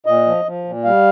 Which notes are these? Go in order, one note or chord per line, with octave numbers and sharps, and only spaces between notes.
A#2 D#5
F3
F3
A#2
G3 F5